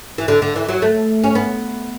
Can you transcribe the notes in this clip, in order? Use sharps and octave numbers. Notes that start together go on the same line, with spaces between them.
E3
D3
D3
E3
F#3
A3
C#4
B3